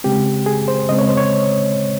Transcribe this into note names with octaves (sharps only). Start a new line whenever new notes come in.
C#3 G#3 C4 G4
G#4
C5
C#3 G#3 C4 D#5
C#5
C5
C#5